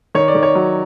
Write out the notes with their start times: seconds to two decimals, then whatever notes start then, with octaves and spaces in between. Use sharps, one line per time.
0.15 D#3 C#5
0.28 D5
0.35 D#3
0.43 C#5
0.55 F#3